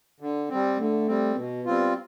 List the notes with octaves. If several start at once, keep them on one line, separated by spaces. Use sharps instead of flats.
D3
G3 C4
D3 A3
G3 C4
B2 B3
G3 C4 F4